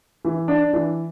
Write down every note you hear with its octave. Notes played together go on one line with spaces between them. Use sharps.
E3
D4
E3